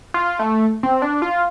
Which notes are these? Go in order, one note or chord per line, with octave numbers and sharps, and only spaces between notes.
F4
A3
C4
D4
F4